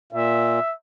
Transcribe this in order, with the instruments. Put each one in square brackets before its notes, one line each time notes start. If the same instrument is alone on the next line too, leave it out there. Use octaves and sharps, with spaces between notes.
[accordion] A#2 [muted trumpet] E5